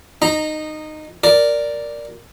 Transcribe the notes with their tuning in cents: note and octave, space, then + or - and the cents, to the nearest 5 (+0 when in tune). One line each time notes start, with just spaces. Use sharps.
D#4 -15 A#5 +0
A#4 +0 D5 +0